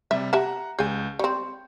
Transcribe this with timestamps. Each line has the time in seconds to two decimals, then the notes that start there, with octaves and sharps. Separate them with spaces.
0.11 C3 G3 E5
0.33 G4 E5 F#5 A5 A#5
0.79 C#2 G#4 G#5 G6
1.19 G3 C4 C#6